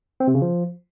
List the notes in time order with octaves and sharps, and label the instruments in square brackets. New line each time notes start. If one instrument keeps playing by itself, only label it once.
[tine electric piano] C4
C3
C#3
F3